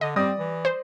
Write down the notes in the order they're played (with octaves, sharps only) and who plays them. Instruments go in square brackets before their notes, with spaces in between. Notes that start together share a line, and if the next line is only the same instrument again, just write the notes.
[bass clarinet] D3 [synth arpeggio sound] D#5
[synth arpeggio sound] G3 [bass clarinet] C4 [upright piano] D5 D#6 A#6
[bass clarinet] E3
[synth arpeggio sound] C5